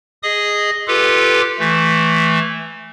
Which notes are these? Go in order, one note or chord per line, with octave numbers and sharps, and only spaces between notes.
G#4 D#5 D#6
F4 G4 A4 B4 D6
E3 A3